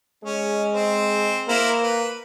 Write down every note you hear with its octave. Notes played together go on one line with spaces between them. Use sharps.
G#3 C#4
C4 C5
A#3 E4 A#4 C5
B4